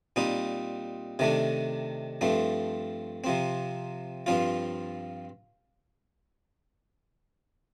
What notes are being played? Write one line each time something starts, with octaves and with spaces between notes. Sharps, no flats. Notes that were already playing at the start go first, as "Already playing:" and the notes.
A#2 G3 C4 D#4
C3 D#3 A3 D4
G2 F3 A3 C4
C3 F3 C4
G2 F3 C4 F4